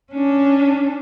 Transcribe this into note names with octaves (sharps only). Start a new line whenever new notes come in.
C#4 D4